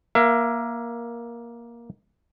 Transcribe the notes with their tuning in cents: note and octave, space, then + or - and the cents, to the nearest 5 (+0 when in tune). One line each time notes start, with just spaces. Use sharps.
A#3 +15 E5 +35